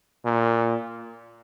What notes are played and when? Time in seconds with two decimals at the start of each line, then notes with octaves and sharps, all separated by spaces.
0.25 A#2